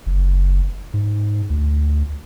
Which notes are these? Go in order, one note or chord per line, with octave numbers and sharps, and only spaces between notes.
F#1
G#2
D2